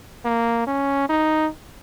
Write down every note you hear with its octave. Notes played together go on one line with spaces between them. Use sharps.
A#3
C#4
D#4